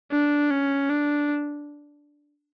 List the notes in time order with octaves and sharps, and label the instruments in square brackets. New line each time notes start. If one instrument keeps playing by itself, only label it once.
[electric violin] D4
C#4
D4